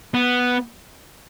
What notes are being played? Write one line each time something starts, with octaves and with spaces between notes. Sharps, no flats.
B3